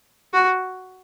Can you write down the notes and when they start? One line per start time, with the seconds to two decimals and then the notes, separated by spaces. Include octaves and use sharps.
0.34 F#4